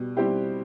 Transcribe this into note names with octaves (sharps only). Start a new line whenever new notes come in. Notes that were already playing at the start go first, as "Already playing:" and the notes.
Already playing: B2 G3
G3 C4 E4 G4